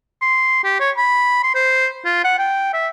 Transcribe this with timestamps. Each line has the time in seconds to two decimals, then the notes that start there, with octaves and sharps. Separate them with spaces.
0.21 C6
0.64 G4
0.80 C#5
0.97 B5
1.43 C6
1.55 C5
2.05 F4
2.24 F#5
2.38 G5
2.73 E5